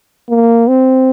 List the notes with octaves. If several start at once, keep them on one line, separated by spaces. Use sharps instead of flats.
A#3
C4